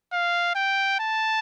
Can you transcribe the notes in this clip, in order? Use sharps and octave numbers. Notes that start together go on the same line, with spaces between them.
F5
G5
A5